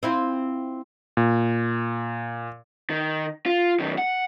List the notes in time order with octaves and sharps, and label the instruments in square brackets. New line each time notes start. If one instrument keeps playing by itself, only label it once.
[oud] C4 E4 F4
[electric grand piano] A#2
[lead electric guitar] D#3
F4
F#2 D#3
F#5